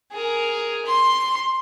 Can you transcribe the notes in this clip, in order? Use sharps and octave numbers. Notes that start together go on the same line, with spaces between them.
G#4 A#4
C6